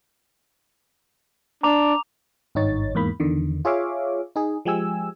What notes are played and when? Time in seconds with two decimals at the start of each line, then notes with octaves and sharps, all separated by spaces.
1.63 D4 A#5 D6 F7
2.55 G#1 G2 D#4 C#5 A6
2.95 E2 G#2 A#3 B5
3.20 E2 D3 D#3
3.65 F4 G#4 C#5 E5 F5 D6
4.36 D#4 G#4
4.65 F3 G#3 G4 G#5 E6